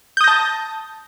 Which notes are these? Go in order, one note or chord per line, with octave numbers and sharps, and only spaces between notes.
A5 D#6 G6 A#6